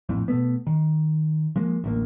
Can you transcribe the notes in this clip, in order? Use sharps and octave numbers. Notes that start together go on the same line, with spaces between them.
A#1 F2 A2
B2 A3 B3
D#3
F3 G#3 A#3
A1 D2 A#3